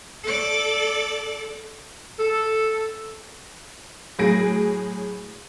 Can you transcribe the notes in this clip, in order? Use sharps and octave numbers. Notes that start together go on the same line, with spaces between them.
A4 D5
A4
A2 F#3 G#4 A#6 D7